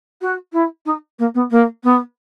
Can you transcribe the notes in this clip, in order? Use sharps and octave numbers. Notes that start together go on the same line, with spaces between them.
F#4
E4
D#4
A#3
B3
A#3
B3